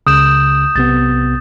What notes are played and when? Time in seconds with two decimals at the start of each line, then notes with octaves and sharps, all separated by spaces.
0.07 C#2 C#3 D#6 G6 E7
0.76 B1 C3 B3 A6